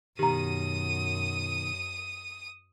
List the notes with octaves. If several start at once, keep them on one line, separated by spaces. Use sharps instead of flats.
F#2 B2 D#3 G4 A#5 D#6 D#7